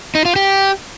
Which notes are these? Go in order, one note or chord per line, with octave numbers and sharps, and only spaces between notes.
D#4
F4
G4